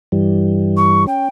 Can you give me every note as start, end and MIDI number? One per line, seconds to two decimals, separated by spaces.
0.12 1.06 43
0.12 1.06 52
0.12 1.06 55
0.76 1.05 85
1.07 1.29 61
1.07 1.26 79